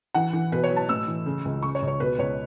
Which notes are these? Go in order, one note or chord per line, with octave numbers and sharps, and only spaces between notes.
E3 F#5
E3
B2 B4
C#5
F#3
A5
A2 E6
E3
C#3
C#2
C#3 C#6
C#5
C#2
C#5
B2 B4
C#2 C#5